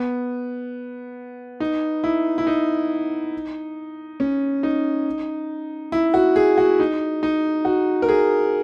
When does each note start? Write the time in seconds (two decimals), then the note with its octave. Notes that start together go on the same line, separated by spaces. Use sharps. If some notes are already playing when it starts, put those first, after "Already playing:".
Already playing: B3
1.60 D#4
2.04 E4
2.38 E4
2.47 D#4
4.20 C#4
4.63 D#4
5.92 E4
6.14 F#4
6.36 G#4
6.58 F#4
6.80 D#4
7.23 D#4
7.65 F#4
8.02 A#4
8.09 G#4